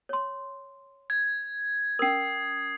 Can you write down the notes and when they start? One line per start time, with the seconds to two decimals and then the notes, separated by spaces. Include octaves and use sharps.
0.09 C#5 C6
1.10 G#6
1.99 C#4 A#4 D#6 C7